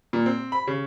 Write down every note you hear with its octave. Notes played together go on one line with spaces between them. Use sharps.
A#2
C4
B5
C#3